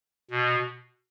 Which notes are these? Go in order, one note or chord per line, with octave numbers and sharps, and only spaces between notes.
B2